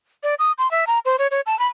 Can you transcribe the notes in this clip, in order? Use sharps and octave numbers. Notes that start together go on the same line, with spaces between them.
D5
D#6
C6
E5
A#5
C5
C#5
C#5
A5
B5